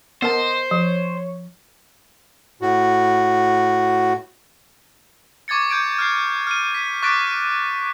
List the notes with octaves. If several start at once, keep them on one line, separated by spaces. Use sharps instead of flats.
B3 A#4 C5 D#5 A5
F3 C#5
A2 F#4
C#6 D6 G#6 A6 C#7
D6 G6 G#6 D7
F6 G6 C7
F6 D#7
B6
C#6 D6 F#6 A6 B6 D7